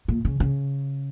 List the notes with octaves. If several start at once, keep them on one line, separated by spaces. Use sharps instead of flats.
A#2
C#3
C#3